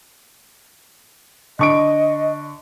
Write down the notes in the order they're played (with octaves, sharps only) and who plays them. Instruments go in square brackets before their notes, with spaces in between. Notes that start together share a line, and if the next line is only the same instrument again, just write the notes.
[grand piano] D3 C#6 D7 [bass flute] D#5